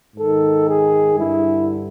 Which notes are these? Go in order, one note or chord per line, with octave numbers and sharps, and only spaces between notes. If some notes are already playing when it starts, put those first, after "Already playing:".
G#2 D#3 A4
G#4
G2 D3 E4